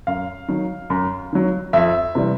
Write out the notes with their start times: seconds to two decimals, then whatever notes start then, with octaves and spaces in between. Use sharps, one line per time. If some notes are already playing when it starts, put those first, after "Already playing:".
0.07 F#2 F5
0.48 D#3 F#3
0.90 F#2
1.33 D#3 F#3
1.73 F2 E5
2.15 C3 E3 G3